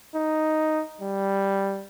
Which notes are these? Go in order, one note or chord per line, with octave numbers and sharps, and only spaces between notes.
D#4
G3